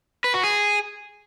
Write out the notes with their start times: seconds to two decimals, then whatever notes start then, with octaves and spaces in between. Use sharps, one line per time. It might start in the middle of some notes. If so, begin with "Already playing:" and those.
0.24 B4
0.34 F#4
0.43 G#4